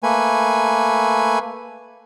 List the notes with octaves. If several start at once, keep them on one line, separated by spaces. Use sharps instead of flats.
A3 A#3 B4 G#5